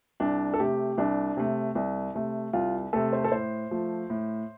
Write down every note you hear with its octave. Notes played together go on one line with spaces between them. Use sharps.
C2 D4
A4
C3 A3 G4
C2 D4
C3 A3
C2
C3 A3
C2 F4
C3 A3 A4
C5
A4
A2 C5
F3 A3
A2